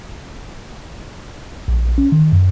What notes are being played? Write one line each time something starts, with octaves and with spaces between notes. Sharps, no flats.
A#1
C#4
D#3
F#2